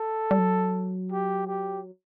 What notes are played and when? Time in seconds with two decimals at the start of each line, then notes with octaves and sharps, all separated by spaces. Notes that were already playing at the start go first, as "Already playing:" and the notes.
Already playing: A4
0.31 G3
0.39 F#3
1.12 G4
1.48 G4